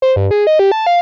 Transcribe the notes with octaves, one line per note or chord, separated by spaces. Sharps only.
C5
G2
G#4
D#5
G4
A5
F5